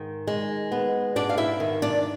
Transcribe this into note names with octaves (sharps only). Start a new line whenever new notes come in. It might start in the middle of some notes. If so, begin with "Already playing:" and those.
Already playing: G#2 D#3
G#3
B3
G#2 D4 D5
F5
E4 E5
D#3
D4 D5